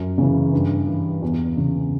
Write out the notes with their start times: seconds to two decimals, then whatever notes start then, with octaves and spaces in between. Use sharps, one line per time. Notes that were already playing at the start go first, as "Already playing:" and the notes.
Already playing: F#2
0.18 C#3 E3
0.53 G2
0.87 E3
1.22 E2
1.57 C#3 E3